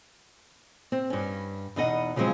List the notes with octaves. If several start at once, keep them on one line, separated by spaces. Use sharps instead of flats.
C4
G2 C#4
E2 B2 D#4 D#5 F#5
C#3 F3 F#3 G#3 C4